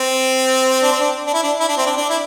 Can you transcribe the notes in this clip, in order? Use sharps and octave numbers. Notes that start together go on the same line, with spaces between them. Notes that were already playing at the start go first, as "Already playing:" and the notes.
Already playing: C4
D4
C4
D4
D4
E4
D4
E4
D4
C4
D4
D4
E4